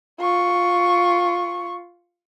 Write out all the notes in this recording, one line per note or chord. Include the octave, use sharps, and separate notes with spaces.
F4 C#6